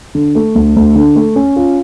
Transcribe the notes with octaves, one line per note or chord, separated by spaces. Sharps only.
D3
A3
D2
D2
D3
A3
C#4
F4